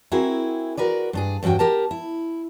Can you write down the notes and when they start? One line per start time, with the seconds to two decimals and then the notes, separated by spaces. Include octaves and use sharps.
0.12 C4 E4 F#4 G#4 A#4
0.77 F#4 A#4 B4 D5
1.13 G2 D4 G#4
1.43 E2 G2 C#4 F#4 G5
1.59 G4 A#4 A5
1.91 E4